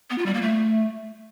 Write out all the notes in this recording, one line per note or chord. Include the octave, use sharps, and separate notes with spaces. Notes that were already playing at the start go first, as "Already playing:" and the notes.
B3
F4
G3
A#3
A3